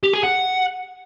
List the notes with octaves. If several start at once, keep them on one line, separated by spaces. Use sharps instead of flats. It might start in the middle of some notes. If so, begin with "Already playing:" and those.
G4
G#4
F#5